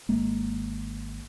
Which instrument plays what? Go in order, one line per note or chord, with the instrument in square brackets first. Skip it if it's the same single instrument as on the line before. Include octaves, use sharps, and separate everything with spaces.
[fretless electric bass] G#1 G#3 A#3